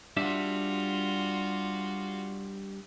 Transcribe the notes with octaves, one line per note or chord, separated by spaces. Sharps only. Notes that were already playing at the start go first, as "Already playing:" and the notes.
G3 D4 F4 F#4 E5